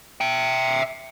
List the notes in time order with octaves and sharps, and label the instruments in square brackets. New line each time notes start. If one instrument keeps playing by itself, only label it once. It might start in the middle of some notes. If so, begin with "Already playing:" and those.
[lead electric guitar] E5 G5